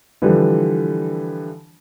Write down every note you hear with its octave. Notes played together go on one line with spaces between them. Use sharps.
D3 E3 F3 G3